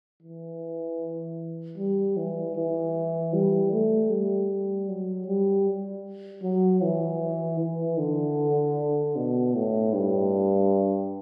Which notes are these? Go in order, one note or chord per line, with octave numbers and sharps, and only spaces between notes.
E3
G3
E3
E3
G3
A3
G3
F#3
G3
F#3
E3
E3
D3
B2
A2
G2